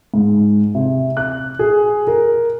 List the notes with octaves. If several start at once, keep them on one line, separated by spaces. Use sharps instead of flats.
G#2
C3
F#6
G#4
A#4